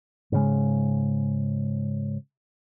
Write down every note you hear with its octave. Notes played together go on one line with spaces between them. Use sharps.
G#2 C#3 G#3